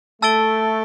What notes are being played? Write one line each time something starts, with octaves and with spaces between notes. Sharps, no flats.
A3 A5 E6 A6 D7 G7